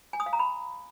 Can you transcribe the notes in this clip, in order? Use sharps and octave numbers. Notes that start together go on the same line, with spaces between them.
G#5
D#6
F5
A#5
B5